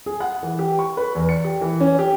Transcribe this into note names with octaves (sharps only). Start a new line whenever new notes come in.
G#4
F#5
E3
G4
C#6
B4
E2
C#7
G4
E3
C#4
G4